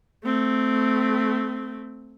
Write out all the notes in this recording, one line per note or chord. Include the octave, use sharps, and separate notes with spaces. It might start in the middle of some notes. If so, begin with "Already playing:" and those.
A3 C4